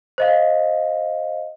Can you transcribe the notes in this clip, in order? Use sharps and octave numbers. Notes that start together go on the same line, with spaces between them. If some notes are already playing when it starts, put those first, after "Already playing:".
C5 D#5 F5